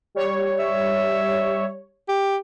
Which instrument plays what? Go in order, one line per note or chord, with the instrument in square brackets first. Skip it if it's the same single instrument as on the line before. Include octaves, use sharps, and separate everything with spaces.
[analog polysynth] G3 C#5
[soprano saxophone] E5
G4